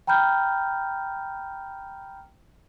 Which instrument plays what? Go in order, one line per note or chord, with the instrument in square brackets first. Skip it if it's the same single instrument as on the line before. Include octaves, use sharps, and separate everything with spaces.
[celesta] G5 A#5 B5 F6 G6